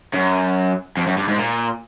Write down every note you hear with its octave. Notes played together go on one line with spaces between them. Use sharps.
F#2
F2
F#2
G2
G#2
A#2